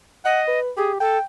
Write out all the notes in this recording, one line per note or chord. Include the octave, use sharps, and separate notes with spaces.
D#5 F#5
B4
G4 G#4
A4 G5